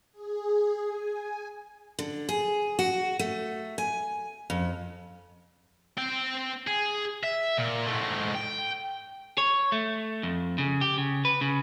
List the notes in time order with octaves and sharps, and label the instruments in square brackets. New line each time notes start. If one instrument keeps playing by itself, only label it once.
[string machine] G#4
G#5
[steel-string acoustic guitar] D3
G#4
F#4
A3
G#5
F2
[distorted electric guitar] C4 G5
G#4
E5
A#2
G#2 A3
G5
[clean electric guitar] C#5
A3
F2
C#3
G4
C#3
B4
C#3